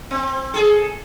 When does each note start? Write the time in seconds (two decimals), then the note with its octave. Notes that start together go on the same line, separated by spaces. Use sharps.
0.11 C4
0.54 G#4 A4